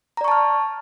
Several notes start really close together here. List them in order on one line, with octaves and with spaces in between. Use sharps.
A#5 D5 C#6 A5 F6